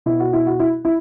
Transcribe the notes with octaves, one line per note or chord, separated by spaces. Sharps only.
B2 E4
F#4
E4
F#4
E4
E4